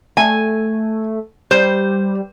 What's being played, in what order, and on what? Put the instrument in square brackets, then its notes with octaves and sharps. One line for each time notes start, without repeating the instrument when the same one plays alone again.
[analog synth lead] A3 [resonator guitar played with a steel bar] G#5
[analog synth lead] G3 [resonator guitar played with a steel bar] C5